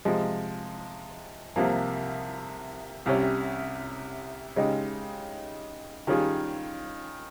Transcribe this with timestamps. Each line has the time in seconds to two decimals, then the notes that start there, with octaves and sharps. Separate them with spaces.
0.05 C3 F3 G#3
1.56 C2 C3 F3 A#3
3.06 C2 C3 G3 C#4
4.56 C#3 G#3 D#4 G4
6.07 D#3 G3 C#4 F4 G#4